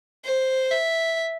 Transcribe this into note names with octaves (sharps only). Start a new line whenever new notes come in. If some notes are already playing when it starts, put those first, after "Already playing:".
C5
E5